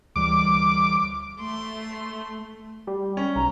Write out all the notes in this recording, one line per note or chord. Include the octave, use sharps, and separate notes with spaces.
D2 E3 G3 D6
A3 C6
G3
C#4
B1 A#5